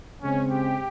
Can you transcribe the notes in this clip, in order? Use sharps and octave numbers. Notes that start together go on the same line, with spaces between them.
C#3 G#3 C4 C#4
G4